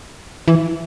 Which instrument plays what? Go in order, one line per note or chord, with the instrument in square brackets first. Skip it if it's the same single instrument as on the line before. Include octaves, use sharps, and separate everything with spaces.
[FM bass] E3